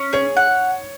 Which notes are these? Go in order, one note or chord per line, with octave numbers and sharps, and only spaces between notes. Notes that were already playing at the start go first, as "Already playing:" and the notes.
Already playing: C#4
G#4 C#5
F#5